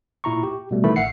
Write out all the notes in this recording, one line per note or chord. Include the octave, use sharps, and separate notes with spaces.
A#2 E4 A#5 C#6
G4
B2 G3 A3
D#3 E3 A3 B5
A1 E5 F#5 C7 C#7